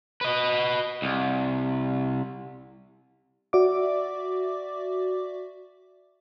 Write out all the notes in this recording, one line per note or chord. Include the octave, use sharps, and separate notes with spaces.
B4 D#5
C2
F#4 D5 E5 D6